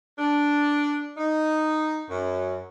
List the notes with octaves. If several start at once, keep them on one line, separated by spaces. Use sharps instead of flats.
D4
D#4
F#2